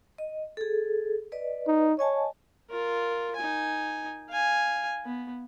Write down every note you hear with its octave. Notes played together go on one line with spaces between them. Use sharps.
D#5
G#4 A4
B4 D5 D#5
D#4
C#5 D#5 G#5 A5
F4 A#4
D#4 G#5
F5 G#5
B3